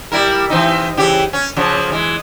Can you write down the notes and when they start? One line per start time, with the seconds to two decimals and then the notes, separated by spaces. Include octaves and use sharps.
0.12 G3 E4 A#4
0.50 E3 C4 D#4
0.97 C#3 E3 G4
1.33 C#4
1.56 C#3 F3 F#3
1.92 E3 G#3